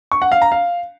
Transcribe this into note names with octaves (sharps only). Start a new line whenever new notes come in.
C#6
F#5
F5
A#5
F5